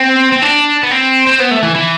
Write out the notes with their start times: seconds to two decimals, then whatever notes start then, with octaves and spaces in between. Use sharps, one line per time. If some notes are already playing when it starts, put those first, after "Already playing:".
Already playing: C4
0.32 C4
0.43 D4
0.83 B3
0.91 C4
1.27 C4
1.40 B3
1.51 A3
1.63 E3
1.75 E3